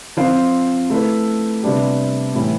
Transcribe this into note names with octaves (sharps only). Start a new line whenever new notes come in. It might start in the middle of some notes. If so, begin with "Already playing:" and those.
F3 C4 F4 C5
A3 E4 B4
C3 G3 B3 D4 G4
A2 E3 G3 B3